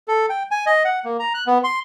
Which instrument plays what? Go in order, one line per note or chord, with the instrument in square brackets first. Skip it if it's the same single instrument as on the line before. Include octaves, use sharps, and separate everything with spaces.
[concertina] A4
G5
G#5
D#5
F#5
A#3
A#5
F#6
B3
C6